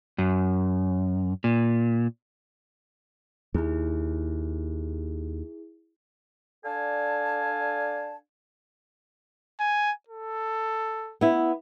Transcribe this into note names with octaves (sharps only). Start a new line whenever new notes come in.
F#2
A#2
D#2 E4 G#4
D4 A4 D5 F5 G#5 A5
G#5
A4
B3 E4